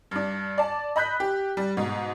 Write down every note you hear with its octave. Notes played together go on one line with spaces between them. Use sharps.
G2 D4
D5 A5
D#5 B5 F#6 G6 B6
G4
G3
G#2 B2